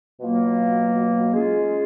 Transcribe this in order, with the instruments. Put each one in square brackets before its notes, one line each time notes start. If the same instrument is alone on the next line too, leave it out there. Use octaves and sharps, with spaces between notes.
[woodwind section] B2 F#3 A#3 F4
G#3 C#4 F4 G#4